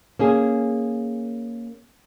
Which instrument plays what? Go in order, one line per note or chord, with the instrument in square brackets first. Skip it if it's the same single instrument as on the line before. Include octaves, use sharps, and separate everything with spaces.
[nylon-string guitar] A#3 C#4 G#4